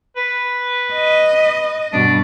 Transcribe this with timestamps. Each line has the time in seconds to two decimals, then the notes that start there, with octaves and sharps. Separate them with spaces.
0.17 B4
0.94 D#5
1.93 G2 B2 D4